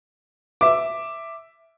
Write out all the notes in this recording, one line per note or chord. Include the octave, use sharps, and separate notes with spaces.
E5 D6